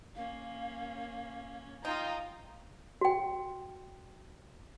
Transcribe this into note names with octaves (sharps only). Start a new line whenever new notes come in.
A#3 C#4 F5
D#4 F4 F5 G5 A#5 D#6
F#4 G5